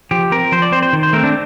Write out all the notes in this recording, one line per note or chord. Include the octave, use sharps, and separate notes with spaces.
F3 G4
C4 A#4
F3 C5
D5
C4 C5
C5
D#3
C5
A3 C4 A#4
D4